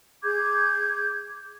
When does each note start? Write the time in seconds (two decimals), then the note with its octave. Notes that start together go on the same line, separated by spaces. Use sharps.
0.23 G#4 D6 G6 G#6